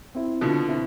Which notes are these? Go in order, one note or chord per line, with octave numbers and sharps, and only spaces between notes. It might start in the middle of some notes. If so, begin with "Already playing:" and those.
C4 E4
B2 D3 F3
C4 E4